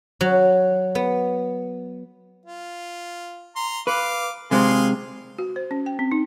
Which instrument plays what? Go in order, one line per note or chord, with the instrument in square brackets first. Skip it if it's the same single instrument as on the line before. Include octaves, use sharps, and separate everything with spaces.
[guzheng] F#3
B3
[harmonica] F4
A#5 C6
[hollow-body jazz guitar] B4 [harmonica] F5 D6
[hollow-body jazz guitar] C3 G#3 C4 [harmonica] G#4 F5 C6
[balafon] F#4
C5
C#4
G5
C4
D#4